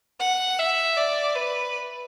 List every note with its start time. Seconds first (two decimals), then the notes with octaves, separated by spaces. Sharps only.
0.20 F#5
0.59 E5
0.97 D5
1.35 B4